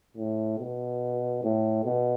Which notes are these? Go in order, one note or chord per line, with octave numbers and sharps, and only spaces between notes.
A2
B2
A2
B2